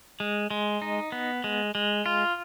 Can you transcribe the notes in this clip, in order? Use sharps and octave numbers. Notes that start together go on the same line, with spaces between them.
G#3
G#3
D#4
B3
G#3
G#3
F4